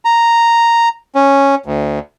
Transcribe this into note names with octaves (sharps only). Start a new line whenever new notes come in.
A#5
C#4
D2